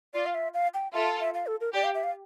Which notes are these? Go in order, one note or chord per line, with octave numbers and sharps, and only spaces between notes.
F4 D5
F5
E5
F5
G5
F4 A4 E5
E5
F5
A4
A#4
G4 D5
F5
E5
F5